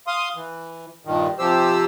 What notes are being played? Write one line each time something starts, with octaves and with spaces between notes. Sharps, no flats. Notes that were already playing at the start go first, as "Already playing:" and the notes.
F5 C6 D#6
E3
G2 A#2 D#3
C3 F3 G4 C5 E6